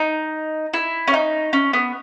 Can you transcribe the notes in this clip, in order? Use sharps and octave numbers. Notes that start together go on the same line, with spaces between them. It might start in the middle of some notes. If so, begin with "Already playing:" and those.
Already playing: D#4
E4
C#4
D#4
C#4
B3